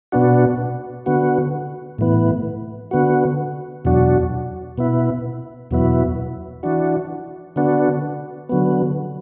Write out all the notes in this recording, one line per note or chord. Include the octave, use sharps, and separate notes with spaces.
B2 B3 D4 F#4
D3 B3 F#4
A2 E3 B3
D3 B3 F#4
E2 B2 F#3 D4 F#4
B2 B3 E4
E2 B2 F#3 B3 E4
E3 D4 F#4
D3 B3 D4 F#4
D3 F#3 B3